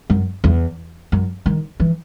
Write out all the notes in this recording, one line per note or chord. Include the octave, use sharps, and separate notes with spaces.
F#2
E2
F#2
D#3
E3